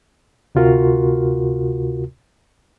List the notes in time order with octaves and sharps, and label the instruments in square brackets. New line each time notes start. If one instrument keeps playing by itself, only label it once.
[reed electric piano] D2 C3 F4 F#4 A#4